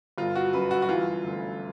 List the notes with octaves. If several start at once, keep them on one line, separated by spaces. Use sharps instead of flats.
G1 F4
F#4
F#2 B4
F#4
F#4
E3 F4
D2